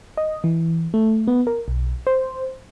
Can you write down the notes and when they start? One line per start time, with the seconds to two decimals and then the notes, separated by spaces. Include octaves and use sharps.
0.17 D#5
0.44 E3
0.94 A3
1.27 B3
1.47 A#4
1.68 B1
2.07 C5